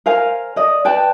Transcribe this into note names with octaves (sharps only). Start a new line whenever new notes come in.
A#4 C5 F5 G#5
D5 D#5
B4 D5 G5 A5